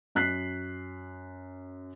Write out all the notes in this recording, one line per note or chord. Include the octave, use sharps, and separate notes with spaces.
F#2 F#6 B6 C7